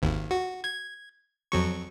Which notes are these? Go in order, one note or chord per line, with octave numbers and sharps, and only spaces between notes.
G#1 D#2
F#4
G#6
F2 F#3 C#6